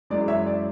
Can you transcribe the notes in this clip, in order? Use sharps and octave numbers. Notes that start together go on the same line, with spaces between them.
F#2 E3 G#3 D5
C#5 E5
D5